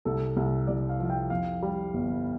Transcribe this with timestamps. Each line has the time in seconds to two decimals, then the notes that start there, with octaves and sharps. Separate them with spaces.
0.05 C2 A4
0.36 C2
0.67 C2 D5
0.89 F5
1.00 F3
1.05 F5
1.10 G5
1.30 F2 F5
1.63 G3
1.94 G1